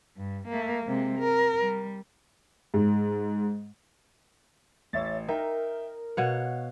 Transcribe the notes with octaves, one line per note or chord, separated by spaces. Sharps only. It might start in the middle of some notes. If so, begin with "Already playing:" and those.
G2
A3 A#3
C3 G#3
A#4
G3
G#2
A1 C#5 E5 A6
D#4 A#4 E5 G5
B2 C#5 F5 F#5